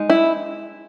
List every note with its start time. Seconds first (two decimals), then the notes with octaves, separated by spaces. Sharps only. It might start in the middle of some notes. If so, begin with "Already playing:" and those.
Already playing: G#3 D#4
0.10 E4